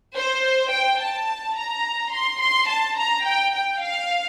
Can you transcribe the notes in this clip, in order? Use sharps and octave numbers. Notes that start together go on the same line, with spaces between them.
C5
G5
A5
A#5
C6
C6
A5
A#5
G5
G5
F5